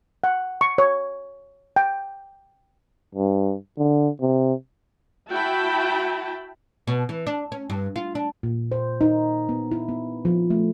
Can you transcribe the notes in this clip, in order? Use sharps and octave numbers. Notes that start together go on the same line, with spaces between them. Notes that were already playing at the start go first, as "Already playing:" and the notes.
F#5
C#6
C#5
G5
G2
D3
C3
E4 F#4 G5 A5 B5
B2
E3
D4
C#4
G2
F4
D4
A#2
C5
D#4
B3
E4
B3
F3
A3